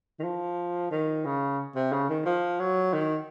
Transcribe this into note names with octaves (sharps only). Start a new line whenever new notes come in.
D#3
F3
D#3
C#3
C3
C#3
D#3
F3
F#3
D#3